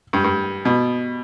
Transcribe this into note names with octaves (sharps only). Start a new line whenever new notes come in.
G2
G2
B2